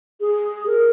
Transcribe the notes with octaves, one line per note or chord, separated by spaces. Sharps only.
G#4
A#4